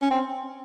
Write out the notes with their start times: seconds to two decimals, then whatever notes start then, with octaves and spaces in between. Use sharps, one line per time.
0.02 C#4
0.10 C4